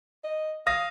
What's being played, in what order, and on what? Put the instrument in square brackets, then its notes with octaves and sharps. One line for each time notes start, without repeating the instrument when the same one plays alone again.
[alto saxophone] D#5
[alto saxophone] F5 [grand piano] D#6 A#6